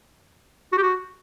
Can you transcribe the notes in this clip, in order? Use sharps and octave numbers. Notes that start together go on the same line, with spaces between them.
F#4
G4
F#4